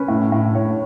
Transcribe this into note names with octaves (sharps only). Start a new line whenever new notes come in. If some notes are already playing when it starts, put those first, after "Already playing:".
Already playing: C#4 B4
A2
A2
A2 C#5